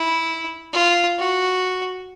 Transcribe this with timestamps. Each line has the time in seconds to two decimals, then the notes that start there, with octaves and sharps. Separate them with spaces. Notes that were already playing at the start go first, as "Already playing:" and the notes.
Already playing: E4
0.73 F4
1.19 F#4